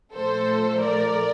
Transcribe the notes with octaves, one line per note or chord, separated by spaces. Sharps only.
A#2 F3 A3 A4 C5
A#4 D5